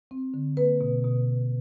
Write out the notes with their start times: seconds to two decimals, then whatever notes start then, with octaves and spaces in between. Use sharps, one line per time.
0.11 C4
0.34 D3
0.57 A#3 B4
0.81 B2
1.04 B2